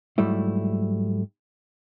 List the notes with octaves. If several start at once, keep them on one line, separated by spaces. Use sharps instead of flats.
G#2 F#3 G3 A3 E4